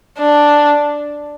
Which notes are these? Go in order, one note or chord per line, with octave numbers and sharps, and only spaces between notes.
D4